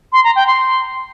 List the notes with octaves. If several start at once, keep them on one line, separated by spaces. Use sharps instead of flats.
C6
A#5
G5
C6